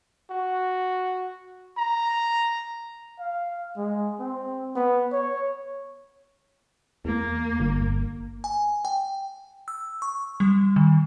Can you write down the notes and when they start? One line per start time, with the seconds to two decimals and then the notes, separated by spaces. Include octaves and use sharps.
0.31 F#4
1.78 A#5
3.19 F5
3.77 G#3
4.19 C4
4.76 B3
5.12 C#5
7.05 E2 A#3
7.60 G1
8.44 G#5
8.85 G5
9.68 E6
10.02 C#6
10.40 G3
10.76 D#3